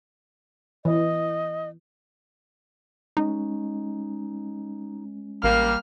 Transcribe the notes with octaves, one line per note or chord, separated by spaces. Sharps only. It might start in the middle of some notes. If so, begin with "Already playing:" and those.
E3 D#5
G#3 C#4 D#4
A1 G3 A#3 F6